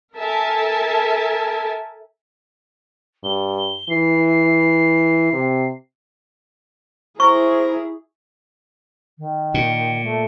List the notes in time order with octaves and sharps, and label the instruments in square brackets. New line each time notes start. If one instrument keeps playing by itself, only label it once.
[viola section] A4 A#4 E5 G#5 A5
[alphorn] G2 [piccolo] G7
[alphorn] E3 [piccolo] C7
[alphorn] C3
[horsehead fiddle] E4 G#4 [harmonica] A#4 A#5 [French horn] C5 [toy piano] C#6
[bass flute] D#3
[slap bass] A#2
[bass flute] A3